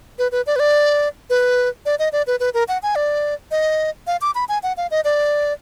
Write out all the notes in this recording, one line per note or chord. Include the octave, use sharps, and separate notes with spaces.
B4
B4
D5
B4
D5
B4
D5
D#5
D5
B4
B4
A#4
F#5
G#5
D5
D#5
F5
D6
B5
G#5
F#5
F5
D#5
D5